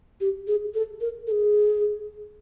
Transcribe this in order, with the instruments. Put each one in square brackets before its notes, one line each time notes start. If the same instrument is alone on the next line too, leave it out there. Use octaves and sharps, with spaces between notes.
[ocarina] G4
G#4
A4
A#4
A4
G#4